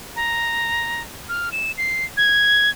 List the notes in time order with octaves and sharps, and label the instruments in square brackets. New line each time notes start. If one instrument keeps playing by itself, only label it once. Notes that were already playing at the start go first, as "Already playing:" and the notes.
[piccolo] A#5
F6
E7
C7
G#6